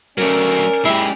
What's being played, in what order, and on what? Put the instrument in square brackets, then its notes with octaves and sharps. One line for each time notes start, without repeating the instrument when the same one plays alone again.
[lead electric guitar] F#3 A3 [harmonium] C#4 D5 [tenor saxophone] A#4
[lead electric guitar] G#3 G4 [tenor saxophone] E4